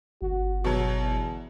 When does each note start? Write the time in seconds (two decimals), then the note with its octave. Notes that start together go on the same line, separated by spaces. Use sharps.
0.22 G1 F#4
0.64 B2 F#3 F#4
1.00 E2